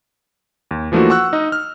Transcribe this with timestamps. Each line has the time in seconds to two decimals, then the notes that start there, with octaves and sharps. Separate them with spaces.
0.71 D#2
0.92 E3 F3 A3 A#3 D4 F#4
1.10 F#5 C#6 E6 F#6
1.33 D#4 D#5
1.52 F6